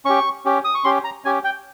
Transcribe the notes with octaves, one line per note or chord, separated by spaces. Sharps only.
C#4 G4 C#6
C#4 G4
D#6
C#6
C#4 G4 C6
A#5
C#4 G4 G#5
G5